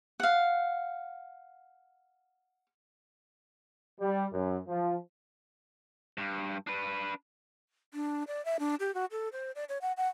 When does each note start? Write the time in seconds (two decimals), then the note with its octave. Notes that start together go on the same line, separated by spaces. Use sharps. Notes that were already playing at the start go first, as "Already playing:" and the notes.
0.20 F5 F#5
4.00 G3
4.32 F#2
4.68 F3
6.18 G2
6.67 D4 B4
7.94 D4
8.28 D5
8.45 E5
8.59 D4
8.80 G4
8.94 F#4
9.11 A4
9.32 C5
9.55 D5
9.69 C#5
9.81 F#5
9.97 F#5